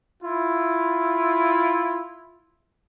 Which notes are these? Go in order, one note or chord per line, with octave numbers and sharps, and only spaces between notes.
E4 F4